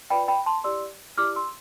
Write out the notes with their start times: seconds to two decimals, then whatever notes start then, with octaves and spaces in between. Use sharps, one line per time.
0.10 F4 B4 D5 G5 B5
0.28 G5 B5
0.46 A5 C6
0.64 E4 G4 D5 C6 E6
1.17 E4 G4 D5 D6 F6
1.36 C6 E6